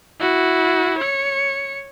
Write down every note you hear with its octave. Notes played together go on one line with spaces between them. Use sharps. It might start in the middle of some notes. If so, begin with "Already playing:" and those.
E4 F#4
C#5 C#7